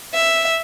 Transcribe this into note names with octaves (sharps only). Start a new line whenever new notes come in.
E5